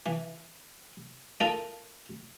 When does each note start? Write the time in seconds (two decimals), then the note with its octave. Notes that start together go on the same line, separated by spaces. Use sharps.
0.06 E3
1.40 D#4 F4 A4 A#4